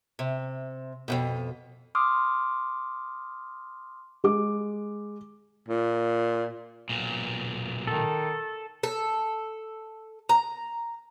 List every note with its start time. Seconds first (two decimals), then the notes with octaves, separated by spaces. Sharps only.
0.19 C3
1.08 F2 G#2 B2
1.95 C6 D6 D#6 F6
4.24 G#3 D6
5.68 A#2
6.89 B1 A#2
7.87 D#3 A4
8.83 A4
10.29 A#5